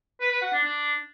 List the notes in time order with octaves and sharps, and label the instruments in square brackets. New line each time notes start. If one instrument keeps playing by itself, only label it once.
[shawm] B4
B4
F#5
D4
D4